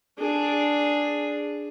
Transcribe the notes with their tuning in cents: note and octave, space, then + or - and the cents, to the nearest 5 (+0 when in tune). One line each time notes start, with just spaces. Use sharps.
D4 +0 G#4 +0